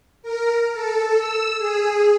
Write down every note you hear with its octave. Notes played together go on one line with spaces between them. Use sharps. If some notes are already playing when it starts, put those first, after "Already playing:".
A#4
A4
E6
G#4